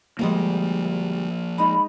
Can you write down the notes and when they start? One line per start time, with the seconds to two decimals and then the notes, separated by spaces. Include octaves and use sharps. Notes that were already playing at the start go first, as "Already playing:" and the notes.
0.19 D2 F3 G3 G#3 A#3
1.58 G#3 D#4 B5